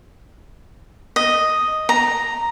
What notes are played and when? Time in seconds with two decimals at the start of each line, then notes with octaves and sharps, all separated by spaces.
1.16 D#5
1.89 A#5